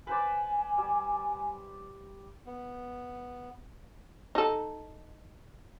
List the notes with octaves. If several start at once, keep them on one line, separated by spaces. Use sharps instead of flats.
B4 C5 D5 G#5
G3
B3
D#4 A4